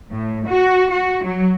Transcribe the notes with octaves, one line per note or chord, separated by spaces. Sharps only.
A2
F#4
F#4
F#3